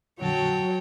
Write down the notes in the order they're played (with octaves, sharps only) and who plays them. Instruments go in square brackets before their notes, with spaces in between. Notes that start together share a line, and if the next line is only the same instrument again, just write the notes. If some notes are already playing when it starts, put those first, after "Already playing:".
[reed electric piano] F2 A#2 D3 [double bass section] F#3 [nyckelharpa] F#4 A5 [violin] C#5 G5